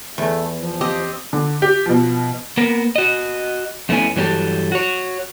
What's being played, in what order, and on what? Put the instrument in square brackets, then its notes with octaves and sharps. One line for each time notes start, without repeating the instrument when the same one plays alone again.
[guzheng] E2 [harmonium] A3
[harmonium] F3
[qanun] C4 G4 D#5
[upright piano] D3
G4
B2 F3
[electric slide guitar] A#3 B3 A#4
F#4 D#5
F2 A3 B3 C#4 E4 G#5
G2 E3 F#3 C4 G4 A4
F#4 C#5